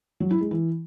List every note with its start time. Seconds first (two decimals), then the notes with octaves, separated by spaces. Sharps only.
0.20 F#3
0.31 E4
0.41 G#3
0.51 E3